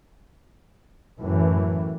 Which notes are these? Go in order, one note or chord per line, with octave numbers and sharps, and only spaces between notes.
F#2 A2 E3